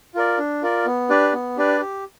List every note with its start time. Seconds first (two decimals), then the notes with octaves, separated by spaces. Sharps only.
0.15 F4 A#4 D5
0.39 D4
0.62 F4 A#4 D5
0.86 B3
1.10 D4 G4 B4 D5
1.33 B3
1.57 D4 G4 B4 D5
1.81 G4